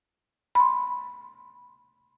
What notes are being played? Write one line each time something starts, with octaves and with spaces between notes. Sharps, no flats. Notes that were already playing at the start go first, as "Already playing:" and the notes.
B5 C6